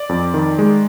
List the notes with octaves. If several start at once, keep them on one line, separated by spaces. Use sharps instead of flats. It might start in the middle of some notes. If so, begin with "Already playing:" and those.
Already playing: D5
F2
D#3
G#3